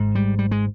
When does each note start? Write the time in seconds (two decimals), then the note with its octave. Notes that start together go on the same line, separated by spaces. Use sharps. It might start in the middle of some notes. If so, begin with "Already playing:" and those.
Already playing: G#1 G#2
0.15 G3
0.39 G3
0.51 G#3